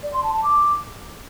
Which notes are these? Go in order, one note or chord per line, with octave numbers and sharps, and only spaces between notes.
D5
C6
A5
A5
D6